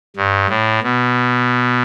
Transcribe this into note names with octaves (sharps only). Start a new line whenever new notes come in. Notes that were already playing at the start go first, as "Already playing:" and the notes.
G2
A2
B2